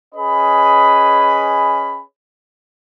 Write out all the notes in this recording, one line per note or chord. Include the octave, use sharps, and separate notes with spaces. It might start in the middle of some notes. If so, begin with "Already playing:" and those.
C#4 G#4 B4 D#5 B5